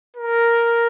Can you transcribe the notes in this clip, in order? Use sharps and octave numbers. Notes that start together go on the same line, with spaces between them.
A#4